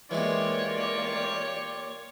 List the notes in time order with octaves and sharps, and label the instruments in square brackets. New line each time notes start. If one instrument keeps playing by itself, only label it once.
[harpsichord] E3 G#3 E4 [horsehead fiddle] A#3 D5 [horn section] F4 G4 C#5